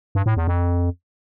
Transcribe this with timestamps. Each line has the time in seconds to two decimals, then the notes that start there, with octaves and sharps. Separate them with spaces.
0.15 G2
0.26 A2
0.37 E2
0.47 F2